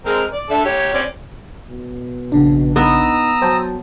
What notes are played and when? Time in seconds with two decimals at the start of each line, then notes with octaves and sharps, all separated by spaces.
0.06 G#3 C4 A#4
0.33 D5
0.50 D3 A4 E5
0.65 G4 C#5
0.94 C4 C#4 D5
1.68 B2
2.32 A#1 C#3 D4
2.76 B3 D#4 A#5 D#6 E6
3.42 F#3 C5 G5 A5